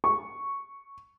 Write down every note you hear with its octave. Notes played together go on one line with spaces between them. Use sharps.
C#6